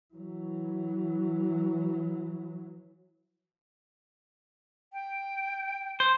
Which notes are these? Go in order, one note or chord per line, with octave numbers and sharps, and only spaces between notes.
E3 F#3
G5
C5